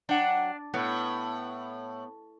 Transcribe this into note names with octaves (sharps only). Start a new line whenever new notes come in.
F#3 D4 F#5 G5
A2 B3